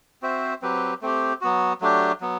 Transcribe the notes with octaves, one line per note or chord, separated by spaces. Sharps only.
C4 F#4 C5 E5
F#3 C4 G4 B4
A3 C4 G4
F#3 B3 F#4
F#3 A3 D4 G4
F#3 B3